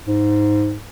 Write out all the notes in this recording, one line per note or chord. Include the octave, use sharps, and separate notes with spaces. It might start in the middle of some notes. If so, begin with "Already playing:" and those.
G#2